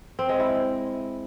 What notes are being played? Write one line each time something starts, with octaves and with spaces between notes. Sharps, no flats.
C4
G#3
E4